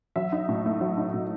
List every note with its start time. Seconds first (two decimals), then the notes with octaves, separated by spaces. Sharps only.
0.16 F#3 E5
0.32 D#4
0.49 A2
0.66 A3
0.81 F#3
0.97 D#4
1.13 A2